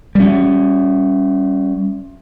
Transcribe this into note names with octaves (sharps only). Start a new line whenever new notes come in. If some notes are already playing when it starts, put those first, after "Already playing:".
G3 C#4